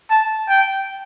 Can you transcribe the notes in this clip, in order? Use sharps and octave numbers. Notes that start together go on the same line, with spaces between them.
A5
G5